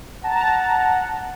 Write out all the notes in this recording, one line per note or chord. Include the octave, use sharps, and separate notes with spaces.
F#5 A5 A#5